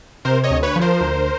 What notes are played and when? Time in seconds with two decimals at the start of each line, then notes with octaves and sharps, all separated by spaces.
0.25 C3 A#4 C5
0.44 C#5 D#5
0.50 D2
0.63 B4 C#5
0.76 F3
0.81 A#4 C5
1.01 D2